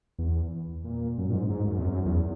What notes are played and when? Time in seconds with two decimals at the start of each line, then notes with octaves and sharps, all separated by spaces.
0.19 E2
0.84 A#2
1.18 F#2
1.30 A#2
1.34 G#2
1.50 G#2
1.67 F#2
1.79 E2
1.84 F#2
2.06 E2